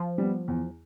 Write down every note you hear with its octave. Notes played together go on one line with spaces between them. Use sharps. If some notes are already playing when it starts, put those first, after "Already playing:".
Already playing: F3
G3 B3
E2